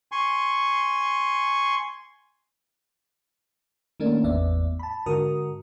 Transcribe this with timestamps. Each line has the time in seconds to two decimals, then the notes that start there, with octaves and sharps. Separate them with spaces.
0.12 G#5 C6 C#6
4.00 D#3 A3 A#3 C#4 D4
4.24 G#1 E2 A2 B3 D5 E5
4.79 A5 B5
5.06 G#2 D3 F#4 A#4 D#6